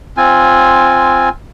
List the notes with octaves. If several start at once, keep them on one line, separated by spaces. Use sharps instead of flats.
C4 F4 G#5